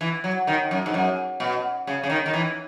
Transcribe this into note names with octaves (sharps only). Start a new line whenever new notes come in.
E3
F#3
D#3
F#2
G#2
F#2
B2
C#3
C#3
D#3
D#3
E3